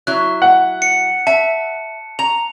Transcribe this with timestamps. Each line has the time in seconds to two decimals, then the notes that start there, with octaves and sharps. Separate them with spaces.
0.07 F#3 E4 F#6
0.42 F#5
0.82 C#7
1.27 E5 A5
2.19 A#5 F7